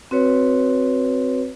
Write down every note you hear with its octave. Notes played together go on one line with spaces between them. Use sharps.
C4 F#4 B4 C#5